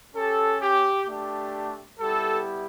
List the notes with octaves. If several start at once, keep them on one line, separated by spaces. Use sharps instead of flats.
C#4 G4 A4
G4
A3 D4 G4
G3 B3 E4 G4 A4